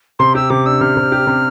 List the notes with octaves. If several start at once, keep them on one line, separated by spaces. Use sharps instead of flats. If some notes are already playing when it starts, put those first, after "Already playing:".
C3 C6
G4 E6
C3 D6
D4 E6
C3 F6
C3
G4
C3